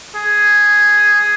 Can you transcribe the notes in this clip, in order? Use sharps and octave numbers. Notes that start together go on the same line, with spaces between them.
G#4